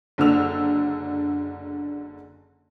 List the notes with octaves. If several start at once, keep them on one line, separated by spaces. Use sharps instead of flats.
F#1 D3 D4 E6 F7